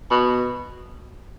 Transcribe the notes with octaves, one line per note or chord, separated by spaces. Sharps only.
B2